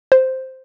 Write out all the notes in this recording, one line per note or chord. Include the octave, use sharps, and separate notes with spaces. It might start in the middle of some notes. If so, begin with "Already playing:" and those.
C5